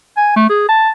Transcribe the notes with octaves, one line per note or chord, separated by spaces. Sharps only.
G#5
A3
G#4
A5